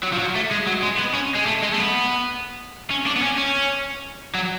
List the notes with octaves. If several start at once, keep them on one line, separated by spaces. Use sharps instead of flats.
F#3
F3
F#3
A3
G#3
F#3
G#3
B3
C#4
G#3
A3
G#3
A3
B3
C#4
D4
B3
C#4
C#4
F#3